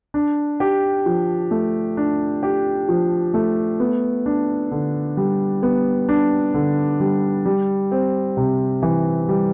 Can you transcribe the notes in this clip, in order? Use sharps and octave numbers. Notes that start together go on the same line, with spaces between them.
D4
G4
F3
A3
D4
G4
F3
A3
B3
D4
D3
G3
B3
D4
D3
G3
G3
C4
C3
E3
G3